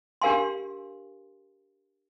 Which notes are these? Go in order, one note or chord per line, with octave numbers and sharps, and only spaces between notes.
D4 G4 A#4 F5 G#5 C6